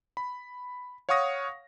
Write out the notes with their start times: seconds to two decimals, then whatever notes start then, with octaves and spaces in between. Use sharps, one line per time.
0.17 B5
1.09 C#5 F5 F#5 C#6 D#6 A#6